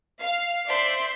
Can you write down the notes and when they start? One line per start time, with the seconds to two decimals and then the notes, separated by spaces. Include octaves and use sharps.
0.20 F5
0.67 C5 D5 E5 C6